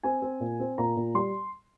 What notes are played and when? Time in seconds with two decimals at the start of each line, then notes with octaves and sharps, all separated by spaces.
0.03 C4 G#5
0.22 C4
0.40 A#2
0.60 C4
0.78 A#2 A#5
0.97 A#2
1.14 G3 C6